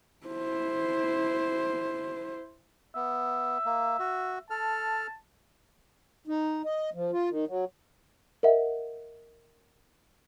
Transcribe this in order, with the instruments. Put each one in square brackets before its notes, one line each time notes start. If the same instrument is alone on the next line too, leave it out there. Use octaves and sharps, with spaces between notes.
[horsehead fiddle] E4 C5
[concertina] B3 [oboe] E5
[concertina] A#3
F#4
[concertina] A4 F6 [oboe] A5
[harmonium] D#4
D#5
F3
F4
D#3
F#3
[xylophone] A#4 D#5 E5 F#5